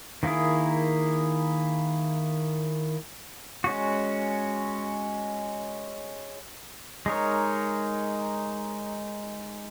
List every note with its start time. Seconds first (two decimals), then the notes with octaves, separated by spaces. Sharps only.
0.23 D#3 A#3 E4 G#4
3.64 G#3 C#4 F#4
7.06 G#3 D#4 A#4 C#5